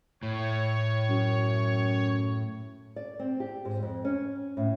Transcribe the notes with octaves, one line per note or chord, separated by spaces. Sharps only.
A2 C#5
F#2
D5
C4
G4
G#2
F2
C#4
A2